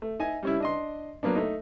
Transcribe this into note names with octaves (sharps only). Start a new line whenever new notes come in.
A3
D#4 D#5 E5 G#5
G3 C#4 E4
D4 D#5 C6
F#3 A#3 B3 D4
A3 D#4